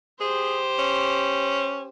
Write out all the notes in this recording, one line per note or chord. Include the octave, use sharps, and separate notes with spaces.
G4 G#4 C5
C#4